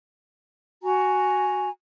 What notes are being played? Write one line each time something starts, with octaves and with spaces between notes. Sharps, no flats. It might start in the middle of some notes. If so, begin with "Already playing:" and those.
F#4 G#5 A#5